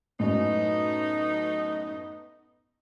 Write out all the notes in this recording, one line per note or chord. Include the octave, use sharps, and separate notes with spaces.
F#2 A2 A3 B3 D#4